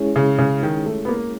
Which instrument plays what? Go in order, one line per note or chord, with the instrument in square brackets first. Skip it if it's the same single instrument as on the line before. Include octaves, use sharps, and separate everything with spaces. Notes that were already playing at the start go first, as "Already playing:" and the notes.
Already playing: [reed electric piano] G#3 C#4 E4 G#4 C#5
[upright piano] C#3
C#3
D#3
A3
B3
A#3